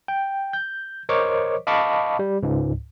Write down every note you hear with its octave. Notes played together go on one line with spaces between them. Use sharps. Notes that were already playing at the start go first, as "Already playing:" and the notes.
G5
G6
A#4 C5 C#5 D#5 C#6 D6
D#5 F5 A5 B5 C#6 D6
G3
C#2 G#2